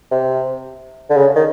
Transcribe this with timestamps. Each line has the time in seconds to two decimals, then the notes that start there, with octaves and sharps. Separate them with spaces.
0.11 C3
1.10 D3
1.17 C#3
1.36 D#3